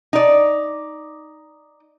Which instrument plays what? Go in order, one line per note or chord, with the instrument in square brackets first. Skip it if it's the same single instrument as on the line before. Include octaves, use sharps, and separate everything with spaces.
[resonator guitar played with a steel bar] D#4 D5